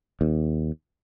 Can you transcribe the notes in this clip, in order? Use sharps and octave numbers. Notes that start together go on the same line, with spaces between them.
D#2